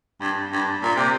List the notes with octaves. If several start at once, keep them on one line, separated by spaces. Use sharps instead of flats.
G2
G2
A#2
C3